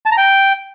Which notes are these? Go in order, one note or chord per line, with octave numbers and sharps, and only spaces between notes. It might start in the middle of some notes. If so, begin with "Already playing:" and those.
A5
A#5
G5